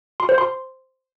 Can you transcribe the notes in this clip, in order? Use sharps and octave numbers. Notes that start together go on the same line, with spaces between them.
C6
C5
C6